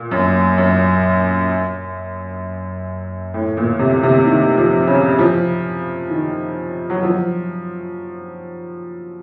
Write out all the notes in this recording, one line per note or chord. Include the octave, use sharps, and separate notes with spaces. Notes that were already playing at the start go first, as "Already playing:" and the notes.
Already playing: A#2
F#2
F#2
A2
A#2
C3
C3
D#3
F3
C#3
F3
D#3
F#3
F3